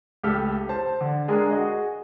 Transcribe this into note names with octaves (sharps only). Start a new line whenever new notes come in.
C#2 A3 G4 A4 F6
C5 A5
D3
G#3 D4 G#4 A#4
F#4 G#4 D#5